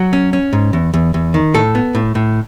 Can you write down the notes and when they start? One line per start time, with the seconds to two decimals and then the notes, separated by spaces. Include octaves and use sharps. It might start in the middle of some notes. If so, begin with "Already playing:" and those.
Already playing: F#3 F#4
0.13 C#4
0.33 C#4
0.53 G#2
0.73 E2
0.94 E2
1.14 E2
1.34 D#3
1.54 A2 A4
1.75 B3
1.95 A2
2.15 A2